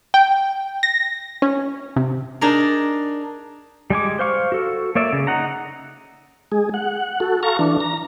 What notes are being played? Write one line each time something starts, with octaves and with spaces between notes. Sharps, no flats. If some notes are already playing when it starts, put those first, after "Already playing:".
G5
A#6
C#4
C3
D4 D#4 G#4 A#4
G3 G#3 G#5 D6
C5 F5 C#6
F#4 A4
A#3 C#5 D5 E5
C#3
D#4 F#5 A#5
G#3 G#4
F#5
F#4 A4
A4 F5 A#5 C#6
E3 D4
A#5